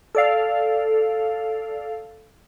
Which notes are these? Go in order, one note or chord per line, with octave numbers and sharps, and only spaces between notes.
A4 D5 F5